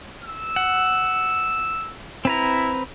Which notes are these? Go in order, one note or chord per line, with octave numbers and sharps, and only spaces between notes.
E6
F#5
C4 E4 B4 A#5